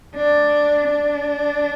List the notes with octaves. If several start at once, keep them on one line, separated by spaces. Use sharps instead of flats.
D4
D4